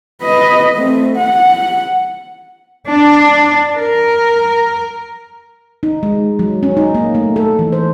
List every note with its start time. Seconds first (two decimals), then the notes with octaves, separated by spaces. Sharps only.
0.23 B4 D#5
0.75 A3 C4
1.16 F#5
2.87 D4
3.78 A#4
5.83 D#4
6.03 G#3
6.39 F#3
6.63 C#4
6.77 D#4
6.95 A#3
7.15 A3
7.36 A4
7.59 E3
7.72 C5